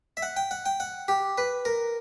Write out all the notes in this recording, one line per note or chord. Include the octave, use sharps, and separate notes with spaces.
E5
F#5
G5
F#5
G5
F#5
G4
B4
A#4